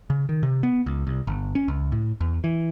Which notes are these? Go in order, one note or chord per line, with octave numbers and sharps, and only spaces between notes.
C#3
D#3
C3
B3
C#2
C2
G1
C#4
C#2
A2
E2
E3